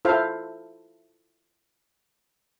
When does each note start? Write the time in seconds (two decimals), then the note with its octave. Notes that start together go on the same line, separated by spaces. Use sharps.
0.05 E4 F4 A4 C5 E5 F5